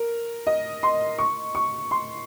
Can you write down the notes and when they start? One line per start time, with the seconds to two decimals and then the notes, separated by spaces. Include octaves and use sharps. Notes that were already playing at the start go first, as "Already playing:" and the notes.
Already playing: A#4
0.47 D#5
0.83 C6
1.19 C#6
1.55 C#6
1.91 C6